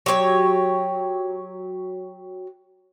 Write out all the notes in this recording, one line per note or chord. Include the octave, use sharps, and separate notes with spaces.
F#3 G4 C5 C#5